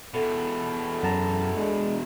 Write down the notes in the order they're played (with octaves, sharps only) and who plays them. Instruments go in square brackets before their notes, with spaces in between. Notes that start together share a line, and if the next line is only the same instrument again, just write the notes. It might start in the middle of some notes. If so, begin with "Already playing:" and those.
[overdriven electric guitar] E2 B2 [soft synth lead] A4
[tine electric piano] F#2 A5 A#5
[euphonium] G#3 [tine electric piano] D4